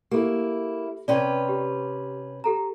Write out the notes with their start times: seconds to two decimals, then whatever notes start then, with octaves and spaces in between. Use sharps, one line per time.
0.11 A#3 E4 G4 A4
1.08 C3 C#4 B4 D5 G5
1.49 G4
2.44 G4 A4 A#5